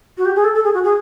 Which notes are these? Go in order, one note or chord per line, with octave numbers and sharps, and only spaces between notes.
F#4
G4
G#4
A4
A4
G#4
F#4
G#4